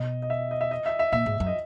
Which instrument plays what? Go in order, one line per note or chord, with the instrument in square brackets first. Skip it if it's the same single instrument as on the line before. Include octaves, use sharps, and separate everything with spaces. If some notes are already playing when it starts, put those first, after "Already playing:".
Already playing: [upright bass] B2 [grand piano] D#5
[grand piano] D#5
E5
D#5
E5
D#5
E5
E5
[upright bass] A#2 [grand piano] E5
[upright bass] G#2
F#2
[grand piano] D#5